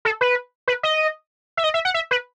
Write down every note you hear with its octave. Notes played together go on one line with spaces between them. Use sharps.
A4
B4
B4
D#5
E5
D#5
E5
F#5
E5
B4